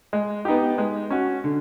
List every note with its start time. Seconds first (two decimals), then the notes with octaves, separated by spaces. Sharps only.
0.13 G#3
0.45 B3 D#4 G4
0.78 G#3
1.10 C#4 F#4
1.44 D3